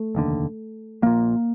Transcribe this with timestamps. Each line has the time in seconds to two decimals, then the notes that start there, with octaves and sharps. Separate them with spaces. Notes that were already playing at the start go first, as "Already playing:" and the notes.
Already playing: A3
0.15 F1 D#2 D3
1.02 A#1 A#2 A#3